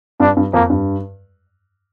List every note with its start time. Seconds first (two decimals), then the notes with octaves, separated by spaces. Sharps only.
0.20 G2 D4
0.37 G2
0.53 F2 A#3
0.70 G2